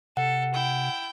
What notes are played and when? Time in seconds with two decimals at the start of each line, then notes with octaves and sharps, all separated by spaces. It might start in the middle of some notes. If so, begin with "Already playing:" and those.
0.17 C3 A4 F#5
0.54 E4 G5